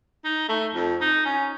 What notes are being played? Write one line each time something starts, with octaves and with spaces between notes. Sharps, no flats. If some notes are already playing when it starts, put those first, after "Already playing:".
D#4
A3
F2
D#4
C#4